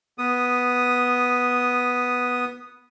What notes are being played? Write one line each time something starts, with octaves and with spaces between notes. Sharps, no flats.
B3 D#6